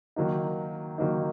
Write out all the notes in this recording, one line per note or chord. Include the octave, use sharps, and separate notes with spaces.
D#3 F#3 A#3 D#4
D#3 F#3 A#3 D#4